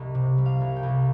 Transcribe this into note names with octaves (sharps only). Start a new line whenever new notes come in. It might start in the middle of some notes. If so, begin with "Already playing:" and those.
Already playing: C2 G3 D#5
C3
G3
F5
C2
G5
C2